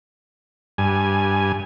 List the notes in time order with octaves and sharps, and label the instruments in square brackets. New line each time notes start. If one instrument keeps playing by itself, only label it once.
[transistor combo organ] G2 G#5